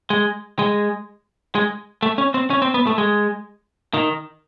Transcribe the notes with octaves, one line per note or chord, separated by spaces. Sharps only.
G#3
G#3
G#3
A3
C#4
C4
C#4
C4
B3
A3
G#3
D#3